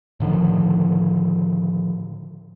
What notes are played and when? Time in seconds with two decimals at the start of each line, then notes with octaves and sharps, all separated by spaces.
0.20 A2 D3 D#3 F3